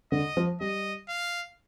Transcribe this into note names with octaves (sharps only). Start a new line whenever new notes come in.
D3 D#5
F3
G3 D#5
F5